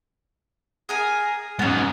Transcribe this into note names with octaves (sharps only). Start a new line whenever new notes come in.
G#4 A#4 G#5
G#2 F#3 B3 C#4